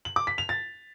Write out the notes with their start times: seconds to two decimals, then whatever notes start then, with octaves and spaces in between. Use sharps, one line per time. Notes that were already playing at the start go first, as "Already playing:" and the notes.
0.05 F#7
0.16 D6
0.27 B6
0.38 F7
0.49 A6